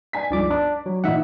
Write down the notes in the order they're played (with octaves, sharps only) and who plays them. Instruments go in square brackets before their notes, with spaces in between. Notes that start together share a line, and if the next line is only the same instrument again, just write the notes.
[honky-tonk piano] D5 G#5 B6
[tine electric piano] C#2 D5 D6 [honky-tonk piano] G2 F3 G#3
[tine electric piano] D4 [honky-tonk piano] D5 D6
[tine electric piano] F#3
[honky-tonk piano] A1 D#4 D#5 [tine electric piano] A#2 E5 F#5